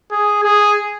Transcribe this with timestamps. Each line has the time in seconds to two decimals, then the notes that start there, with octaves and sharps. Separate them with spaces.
0.11 G#4
0.43 G#4